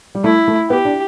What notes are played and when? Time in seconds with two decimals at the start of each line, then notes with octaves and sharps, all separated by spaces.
0.15 G3
0.24 A3 E4
0.48 A3
0.70 B3 G4
0.85 D4